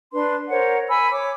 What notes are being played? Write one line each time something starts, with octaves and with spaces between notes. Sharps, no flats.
D4 B4 C6
A#4 C5 C#5 F#5
G#5 B5 E6
C#5 D6